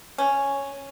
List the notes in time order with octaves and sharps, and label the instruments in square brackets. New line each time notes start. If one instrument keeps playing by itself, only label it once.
[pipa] C#4